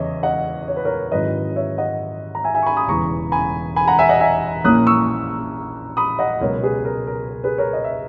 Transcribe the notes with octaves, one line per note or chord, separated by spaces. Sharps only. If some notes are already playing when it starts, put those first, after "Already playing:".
Already playing: E2 C#3 C#5 D#5 E5
D#5 F#5
C#5
B4
A#4 C#5
G#2 D#3 F#3 C#4 E4 B4 D#5
C#5 E5
D#5 F#5
A#5
E5 G#5
E5 G#5
C#6
G#5 B5
B5 D#6
E1 E2 C#3 E3 A#5 C#6
G#5 B5
G#5 B5
F#5 A#5
E5 G#5
D#5 F#5
E5 G#5
A#1 A#2 A#3 C#4 E4 D#6 F#6
C#6 E6
B5 D#6
D#5 F#5
C#2 B2 F#3 A#4 C#5
G#4 B4
A#4
A#4
A#4
G#4 B4
A#4 C#5
D#5
E5